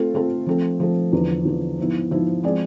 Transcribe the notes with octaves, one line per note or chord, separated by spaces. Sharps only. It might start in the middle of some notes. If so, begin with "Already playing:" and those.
Already playing: A3 C4 F4 A4
A3 C4 F4 A4
F3 A3 C4
F3 A3 C4
E2 D3 F3
E2 D3 F3
G#2 F3 B3 E4
G#2 F3 B3 E4
F3 G#3 C4 G#4 D5